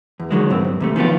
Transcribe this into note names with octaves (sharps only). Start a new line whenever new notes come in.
E2
D3 D#3 F#3 G#3
C2 G2 C4
G2
D#2 C3 A3
D#3 F3 B3 F4